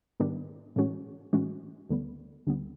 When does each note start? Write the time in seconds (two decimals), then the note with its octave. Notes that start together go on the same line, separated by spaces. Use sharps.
0.20 G#2 D#3 G3 B3 D4
0.76 A2 E3 G#3 C#4 F#4
1.33 A2 E3 G#3 C#4 F#4
1.89 D2 D3 G3 B3
2.47 D2 D3 G3 B3